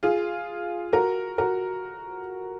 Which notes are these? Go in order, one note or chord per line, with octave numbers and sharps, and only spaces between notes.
F4 G#4
F#4 A#4
F#4 A#4